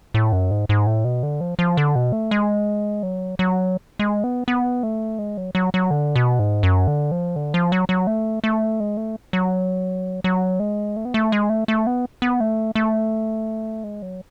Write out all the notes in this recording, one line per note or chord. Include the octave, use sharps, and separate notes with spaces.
A2
F#2
G#2
G#2
A2
B2
D3
F3
F3
D3
B2
A3
G#3
F#3
F#3
G#3
B3
B3
A3
G#3
F#3
F#3
F#3
D3
B2
G#2
F#2
D3
F3
D3
F3
F#3
F#3
A3
A3
G#3
A3
F#3
F#3
G#3
A3
B3
A3
G#3
A3
A3
B3
B3
A3
A3
G#3
F#3